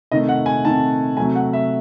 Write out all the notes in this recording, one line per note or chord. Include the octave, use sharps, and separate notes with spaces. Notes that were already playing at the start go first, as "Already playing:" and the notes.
C3 D#3 A3 D#5
F#5
G#5
C3 D#3 A3 A5
C3 F#3 A3 G#5
F#5
E5